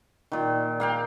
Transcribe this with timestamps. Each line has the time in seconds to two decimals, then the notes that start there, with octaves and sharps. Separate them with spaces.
0.32 A#2 D#3
0.80 A#3 F5 G5